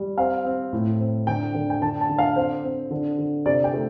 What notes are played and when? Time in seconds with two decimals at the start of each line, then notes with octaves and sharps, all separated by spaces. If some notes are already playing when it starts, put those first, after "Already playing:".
Already playing: G3
0.18 C4 F5
0.45 C4
0.73 A2
0.99 C4
1.27 D3 G5
1.54 D3
1.70 G5
1.82 D3 A5
2.01 A5
2.09 D3
2.18 F5
2.36 C4 C5
2.63 C4
2.91 D3
3.19 D3
3.46 C3 D5
3.64 G5
3.74 A3